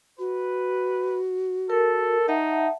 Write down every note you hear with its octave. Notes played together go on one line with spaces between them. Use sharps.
F#4 B4
A4 A#4
D#4 E5 F#5 A5